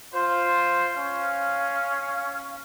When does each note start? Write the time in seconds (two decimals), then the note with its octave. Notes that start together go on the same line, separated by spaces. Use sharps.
0.13 F4 C5
0.95 C#4 F5